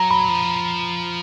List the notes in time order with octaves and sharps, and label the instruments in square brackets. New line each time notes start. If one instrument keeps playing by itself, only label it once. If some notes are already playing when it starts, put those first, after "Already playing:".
Already playing: [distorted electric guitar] F#3 [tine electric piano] A#5
[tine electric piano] B5
[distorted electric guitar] F3